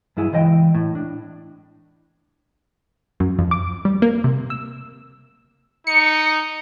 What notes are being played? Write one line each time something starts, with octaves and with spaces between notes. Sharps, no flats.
G2 F#3 E4 G#4
C#2 E3 C5 D#5 G5
A2
D4
F#2
F2
D6
G3
A#3
C3
E6
D#4 C#7